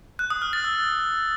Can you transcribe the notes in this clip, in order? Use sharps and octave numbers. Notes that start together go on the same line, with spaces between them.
F#6
D#6
F6
A6
E6